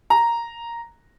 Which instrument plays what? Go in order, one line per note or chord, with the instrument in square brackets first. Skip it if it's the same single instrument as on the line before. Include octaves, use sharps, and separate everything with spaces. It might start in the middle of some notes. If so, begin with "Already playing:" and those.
[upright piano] A#5